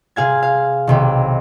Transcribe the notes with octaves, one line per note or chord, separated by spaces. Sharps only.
C3 G#4 F5 G#6
F5
B1 C3 D#3